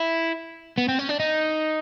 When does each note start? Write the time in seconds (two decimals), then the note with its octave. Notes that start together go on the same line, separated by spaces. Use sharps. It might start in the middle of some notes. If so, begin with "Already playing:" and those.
Already playing: E4
0.78 B3
0.88 C4
0.99 C#4
1.09 D4
1.19 D#4